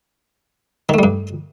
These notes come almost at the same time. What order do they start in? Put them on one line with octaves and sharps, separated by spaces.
D#3 A3 G3 G2